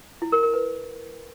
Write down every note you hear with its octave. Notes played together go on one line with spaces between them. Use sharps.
E4
A#4
A#4
B4